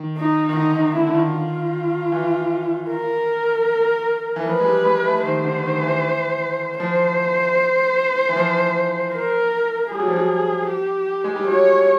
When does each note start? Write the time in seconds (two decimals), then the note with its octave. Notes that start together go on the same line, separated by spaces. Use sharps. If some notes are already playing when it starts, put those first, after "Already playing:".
Already playing: D#3
0.17 D#4
0.49 D#3
0.56 D3 D#4
0.76 D#3
0.95 D3 E4
1.07 D3
1.14 D#3
1.34 F4
2.12 E3
2.90 A#4
4.36 E3
4.46 F3 B4
4.60 G#3
4.65 G3
4.85 G#3
5.04 A3
5.23 D#3 C5
5.44 D3
5.63 D#3
5.83 E3
6.80 F3 C5
8.29 E3
8.36 F3
9.14 A#4
9.91 G3 G#4
10.00 F#3
10.08 F3
10.16 F#3
10.70 G4
11.24 G#3
11.36 G3
11.48 F#3 C#5